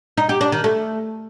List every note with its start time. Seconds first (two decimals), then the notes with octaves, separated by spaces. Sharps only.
0.17 D#4
0.29 G4
0.41 D4
0.52 D#3
0.64 A3